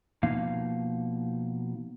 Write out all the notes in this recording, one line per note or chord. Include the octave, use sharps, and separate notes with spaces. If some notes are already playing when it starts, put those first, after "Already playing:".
B2 F3 A#3 D#4 F5